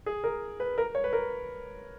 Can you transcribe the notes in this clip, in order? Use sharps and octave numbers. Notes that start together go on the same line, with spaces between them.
G#4
A#4
B4
A#4
C#5
B4
A#4